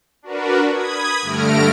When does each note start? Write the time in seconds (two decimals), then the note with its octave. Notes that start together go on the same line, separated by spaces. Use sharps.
0.22 D4 F#4 A#4 B4
0.71 B5 D#6 G#6
1.22 G2 D3 A3 F6 A#6 D7